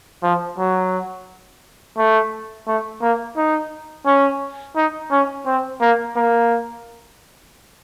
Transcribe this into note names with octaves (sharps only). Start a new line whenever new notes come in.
F3
F#3
A3
A3
A#3
D#4
C#4
D#4
C#4
C4
A#3
A#3